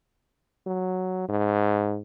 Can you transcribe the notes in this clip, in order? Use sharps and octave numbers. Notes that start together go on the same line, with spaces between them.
F#3
G#2